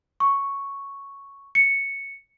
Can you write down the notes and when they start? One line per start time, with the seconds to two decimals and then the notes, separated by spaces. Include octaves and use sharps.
0.20 C#6
1.55 C#7